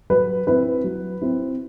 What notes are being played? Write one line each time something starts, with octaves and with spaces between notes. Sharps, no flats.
F#3 B4
C4 E4 B4
F#3
C4 E4